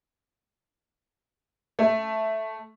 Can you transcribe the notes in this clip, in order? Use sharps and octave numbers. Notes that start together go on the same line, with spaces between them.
A3